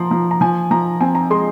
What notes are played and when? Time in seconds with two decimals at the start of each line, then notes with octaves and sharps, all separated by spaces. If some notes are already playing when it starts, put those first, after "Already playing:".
Already playing: F3 A#5 C6
0.11 F3
0.31 A#5
0.41 F3 G#5
0.71 F3 A#5
1.00 C4 G#5
1.15 A#5
1.30 G#3 C6